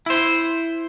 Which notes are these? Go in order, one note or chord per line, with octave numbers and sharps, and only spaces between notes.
E4 C5